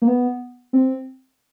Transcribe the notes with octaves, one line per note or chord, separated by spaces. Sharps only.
A#3
B3
C4